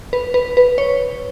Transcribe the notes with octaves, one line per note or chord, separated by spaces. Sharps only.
B4
B4
B4
C#5